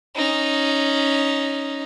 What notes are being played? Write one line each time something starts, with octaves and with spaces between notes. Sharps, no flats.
C#4 D#4